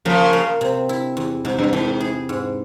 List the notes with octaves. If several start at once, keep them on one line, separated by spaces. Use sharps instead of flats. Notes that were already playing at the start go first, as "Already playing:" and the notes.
C#3 F3 A#3
A#3
C3
E4
E2
G#2 C3
G2
G#2 E3
G#4
G#2